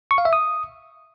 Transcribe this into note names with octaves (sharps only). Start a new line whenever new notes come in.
C#6
F5
E5
D#6